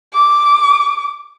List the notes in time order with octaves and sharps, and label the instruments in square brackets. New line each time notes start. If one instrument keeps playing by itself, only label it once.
[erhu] D6